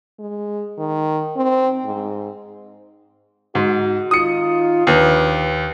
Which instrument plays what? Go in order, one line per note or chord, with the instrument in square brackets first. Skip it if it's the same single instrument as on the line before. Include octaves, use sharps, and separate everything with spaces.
[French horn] G#3
D#3
C4
G#2
[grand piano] G#2 [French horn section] D#4 F#4
[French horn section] D#3 D#4 F4 [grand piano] D#6 C#7
[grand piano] D#2 [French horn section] F3 D4 B4